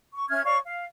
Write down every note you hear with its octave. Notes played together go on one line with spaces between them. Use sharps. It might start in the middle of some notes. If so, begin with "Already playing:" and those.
C#6
C#4 E5 F6 G#6
C#5 D5 F5 C#6
F5